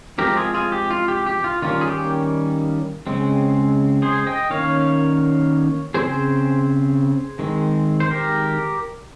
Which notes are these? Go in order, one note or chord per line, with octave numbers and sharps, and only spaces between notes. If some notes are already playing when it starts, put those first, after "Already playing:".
F3 G#3 C4 G4 A#4
F4 G#4
F4 G#4
G4
F4
G4
G4
F4
D#3 G3 A#3 C#4 F4
G#4
G4
C#3 G#3 C4
G#4 C5
D#5 G5
D#3 A#3 C#4 C#5 F5
C#3 G3 C4 G#4 C5
D#3 G#3 C4
C5
G4 A#4